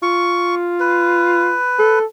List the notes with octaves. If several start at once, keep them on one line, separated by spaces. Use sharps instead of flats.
F4 C#6
B4
A4